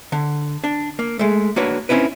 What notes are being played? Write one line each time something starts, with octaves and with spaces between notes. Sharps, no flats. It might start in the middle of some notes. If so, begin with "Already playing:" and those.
D3
D4
A#3
G#3 A3
A#3 D4 F#4 B4 C#5
C4 C#4 D#4 E4 B4